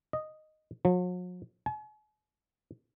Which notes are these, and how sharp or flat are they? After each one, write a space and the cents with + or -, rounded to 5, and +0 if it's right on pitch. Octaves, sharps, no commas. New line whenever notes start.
D#5 -5
F#3 -45
G#5 +45